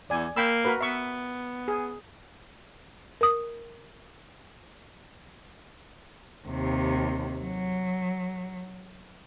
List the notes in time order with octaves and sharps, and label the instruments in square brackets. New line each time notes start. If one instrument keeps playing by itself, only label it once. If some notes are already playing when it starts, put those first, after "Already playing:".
[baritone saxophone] E2 [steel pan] D5 G#5
[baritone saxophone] A#3 [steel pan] G5 B5 E6
[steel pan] F#4 A#4 B4
[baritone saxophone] B3 [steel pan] E5 C#6
[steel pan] G#4
[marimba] A#4 D#6
[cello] D#2 C3
F#3